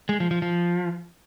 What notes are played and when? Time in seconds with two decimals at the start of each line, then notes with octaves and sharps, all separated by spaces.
0.09 G#3
0.20 F3
0.31 F3
0.42 F3